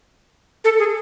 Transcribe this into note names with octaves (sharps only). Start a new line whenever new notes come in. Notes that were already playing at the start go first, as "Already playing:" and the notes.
A4
G#4